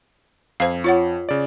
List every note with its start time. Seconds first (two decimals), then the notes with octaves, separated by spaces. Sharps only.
0.60 F2 C5 F5
0.84 F4 C#5 F#5
1.29 C#3 D5